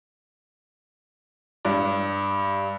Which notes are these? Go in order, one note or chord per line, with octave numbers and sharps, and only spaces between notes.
G2